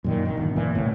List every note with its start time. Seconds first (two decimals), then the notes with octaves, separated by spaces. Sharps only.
0.04 F#2 A#2 D#3
0.25 F1 D#3
0.37 G1
0.56 A#2 E3
0.75 C2 A2